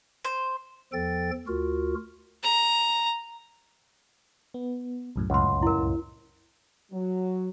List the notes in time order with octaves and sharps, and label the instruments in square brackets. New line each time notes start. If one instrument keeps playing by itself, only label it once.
[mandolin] C5
[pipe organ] E2 F3 A4 G5 A6
D2 F4 F#4 A#4
[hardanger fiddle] A#5
[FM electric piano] B3
C2 F#2 A2
[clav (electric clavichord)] C#2 [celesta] F#5 C6
[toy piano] E4 A#4
[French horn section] F#3